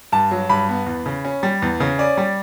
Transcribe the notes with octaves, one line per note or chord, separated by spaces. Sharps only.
G2 A5
F#3
G2 B5
B3
E2
C#3
C#4
G3
E2
C#3
C#4 D5
G3